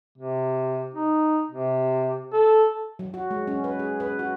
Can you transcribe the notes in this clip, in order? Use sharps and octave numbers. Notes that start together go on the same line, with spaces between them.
C3
D#4
C3
A4
F#3
F#4
G#3
C#4
B4
G#4
B4
F#4